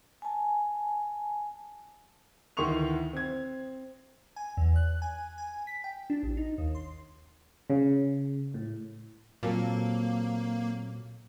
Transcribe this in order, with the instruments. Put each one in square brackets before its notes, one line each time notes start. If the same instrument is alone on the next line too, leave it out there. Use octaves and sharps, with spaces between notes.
[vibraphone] G#5 A5
[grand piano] D2 D#3 E3 C6 C#6 F7
C4 G#6
[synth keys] G#5
E2
F#6
G#5
G#5
B6
G5
D4
A1
D#4
D#2
C6
[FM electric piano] C#3
A2
[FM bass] A#2 [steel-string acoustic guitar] F#3 C4 A4 [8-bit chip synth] A#3